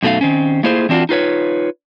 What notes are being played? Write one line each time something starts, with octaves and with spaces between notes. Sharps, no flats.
F#2 B2 A3 D#4 F5
D#3 C4 C#4
A3 A#3 E4 F4 G#4 C5
E3 C4 D4 F4 F#4
D#4 F4 B4 C#5